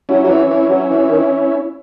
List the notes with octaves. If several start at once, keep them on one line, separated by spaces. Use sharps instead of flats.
F#3 C#4 E4
F#3
E3
E3
F#3
E3
D#3
E3